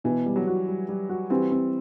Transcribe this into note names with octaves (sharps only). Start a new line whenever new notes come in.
B2 E3
G3
F#3
F#4
G3
G3
F#4
E3 G3 C4
C4